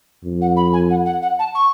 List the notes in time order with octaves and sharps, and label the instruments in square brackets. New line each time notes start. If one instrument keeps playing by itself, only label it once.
[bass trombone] F2
[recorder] F#5
B5
G#5
F#5
F#5
F#5
A5
C#6